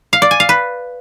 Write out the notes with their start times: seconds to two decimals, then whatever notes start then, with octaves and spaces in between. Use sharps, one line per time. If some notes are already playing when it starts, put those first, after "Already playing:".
0.13 F5
0.22 D5
0.31 G#5
0.40 F5
0.49 B4